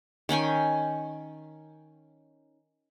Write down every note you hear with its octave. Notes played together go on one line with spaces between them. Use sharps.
D#3 C#4 G5 G#5